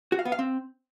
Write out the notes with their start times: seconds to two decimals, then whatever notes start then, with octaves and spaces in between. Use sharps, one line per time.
0.12 F#4
0.19 F5
0.25 B3
0.32 F5
0.39 C4